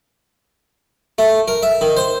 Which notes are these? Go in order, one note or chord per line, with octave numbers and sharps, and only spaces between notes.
A3
A#4
E5
D#3
C5